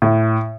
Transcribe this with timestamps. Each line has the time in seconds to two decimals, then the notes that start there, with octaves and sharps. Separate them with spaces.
0.02 A2